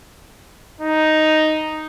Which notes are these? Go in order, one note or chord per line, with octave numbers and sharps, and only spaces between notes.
D#4